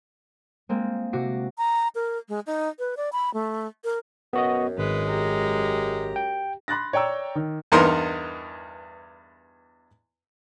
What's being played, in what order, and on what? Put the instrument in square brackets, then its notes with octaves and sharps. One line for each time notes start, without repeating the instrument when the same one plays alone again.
[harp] G#3 A#3 C4
C3 F#4 D6 A#6 C7
[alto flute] A#5
A#4
G#3
D#4
B4
D5
B5
A3
A#4
[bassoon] F#2 [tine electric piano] B3 F#4 D#5
[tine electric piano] G#1 [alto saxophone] G#3 [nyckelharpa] B4
[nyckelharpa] G4 A#5
[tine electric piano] G5
[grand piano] B5 C6 F#6 A6 A#6
C#5 D5 G5 A#5 E6
D#3
[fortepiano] E2 G2 B3 D#4 A#4 C6